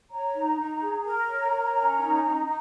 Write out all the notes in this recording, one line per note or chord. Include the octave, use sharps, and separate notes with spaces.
C#5 A#5
D#4
D#4
G#4
A#4 A#5
C#5
A#4
C#4
D#4
D#4
D#4